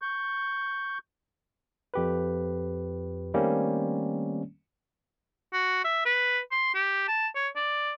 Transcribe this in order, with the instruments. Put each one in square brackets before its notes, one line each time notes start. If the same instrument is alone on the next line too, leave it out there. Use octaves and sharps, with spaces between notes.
[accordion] C#6 G6
[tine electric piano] F2 G4 B4
D#3 G3 A3 A#3 C4 C#4
[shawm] F#4
E5
B4
C6
G4
A5
C#5
D5